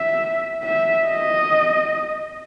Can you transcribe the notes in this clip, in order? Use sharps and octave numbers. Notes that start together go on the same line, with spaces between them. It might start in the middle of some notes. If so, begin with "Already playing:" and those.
Already playing: E5
E5
D#5